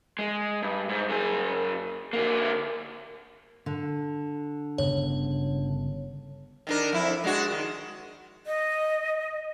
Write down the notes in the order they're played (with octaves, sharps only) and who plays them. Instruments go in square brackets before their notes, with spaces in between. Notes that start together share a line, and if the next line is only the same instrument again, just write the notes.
[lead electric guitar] G#3
G2
G#2
F#2 G#4
D3 A#3
[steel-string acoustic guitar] D3
[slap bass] G1 C#3 B3 [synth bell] C#5
[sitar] D#3 D4 A#4
F2 E4
G#3 D4 F#4
D#3
[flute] D#5